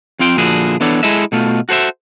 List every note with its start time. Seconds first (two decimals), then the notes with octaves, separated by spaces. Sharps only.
0.19 F2 C4 F4 G5
0.37 A#2 D3 F3 E4 F#4 G#4
0.80 E3 B3 D4 A4 C#5
1.03 G#3 E4 G#4 A4 D#5 E5
1.32 B2 A3 F4
1.69 F#4 A4 C5 C#5 E5